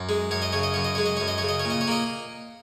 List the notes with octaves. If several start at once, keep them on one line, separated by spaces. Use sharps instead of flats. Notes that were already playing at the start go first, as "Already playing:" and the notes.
Already playing: F#2
G#3
F#2 C#5
D#5
C#3 C#5
D#5
F#2 C#5
D#5
G#3 C#5
D#5
F#2 C#5
D#5
C#3 C#5
D#5
C#5
A#2
D#5
C#5
A#3 D#5